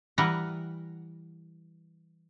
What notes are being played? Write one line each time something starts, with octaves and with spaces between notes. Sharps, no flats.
E3 G3 A#4 B4 F#5